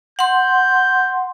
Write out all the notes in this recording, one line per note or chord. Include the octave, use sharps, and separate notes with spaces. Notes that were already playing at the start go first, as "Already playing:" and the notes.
F#5 C6 G6